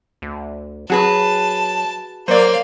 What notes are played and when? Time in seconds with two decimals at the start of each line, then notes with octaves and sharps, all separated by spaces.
0.22 D2
0.90 F#3 F#4 G#4 B4 A5
2.28 F#3 A#3 C5 D5 F5